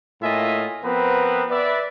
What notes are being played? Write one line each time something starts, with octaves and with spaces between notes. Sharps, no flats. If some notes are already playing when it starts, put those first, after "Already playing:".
A2 A#3 F4 D#5 E5 G#5
F3 B3 C4 A#4 B4
B4 D5 E5